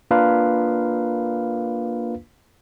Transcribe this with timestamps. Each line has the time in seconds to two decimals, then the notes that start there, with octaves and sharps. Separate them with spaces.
0.11 A#3 D4 F4 A#4 B4 F5